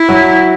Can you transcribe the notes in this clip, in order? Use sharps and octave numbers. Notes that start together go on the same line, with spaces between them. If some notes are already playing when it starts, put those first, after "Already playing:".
Already playing: E4
F#3 F#4